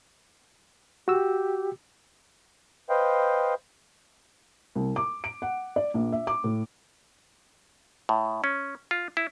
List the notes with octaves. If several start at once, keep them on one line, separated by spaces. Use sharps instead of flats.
F#4 G4 E6
B4 C5 D#5 F5 G5
C2
D6
D7
F#5
D5
A#1
E5
D6
A2
A2
C#4
F4
E4